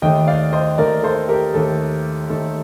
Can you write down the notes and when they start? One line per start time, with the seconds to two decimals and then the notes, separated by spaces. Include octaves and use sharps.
0.02 D#2 D#3 A3 D#5 G5
0.27 D5 F5
0.52 C5 D#5
0.78 D#2 D#3 A3 A#4 D5
1.03 A4 C5
1.29 G4 A#4
1.54 D#2 D#3 A3 A4
2.30 D#2 D#3 A3 A4